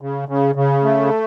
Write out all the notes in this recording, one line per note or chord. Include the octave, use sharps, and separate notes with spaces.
C#3
C#3
C#3
A3